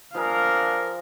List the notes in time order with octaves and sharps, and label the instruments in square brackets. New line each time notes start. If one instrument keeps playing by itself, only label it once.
[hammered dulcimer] F3 G#4 [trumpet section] D4 A#4 [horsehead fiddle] F5